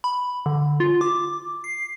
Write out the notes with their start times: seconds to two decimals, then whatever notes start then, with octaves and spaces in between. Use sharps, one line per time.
0.04 B5
0.46 D3
0.80 F4
1.01 D6
1.64 C7